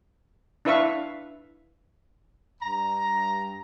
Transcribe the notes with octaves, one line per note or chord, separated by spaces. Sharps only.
D4 E4 B4 E5 F5 C#6
G2 A#5